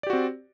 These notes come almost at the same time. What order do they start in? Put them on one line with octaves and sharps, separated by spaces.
D5 G4 F#4 C4